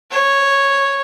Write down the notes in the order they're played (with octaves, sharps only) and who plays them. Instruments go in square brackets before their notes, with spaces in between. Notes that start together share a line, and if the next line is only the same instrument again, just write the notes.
[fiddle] C#5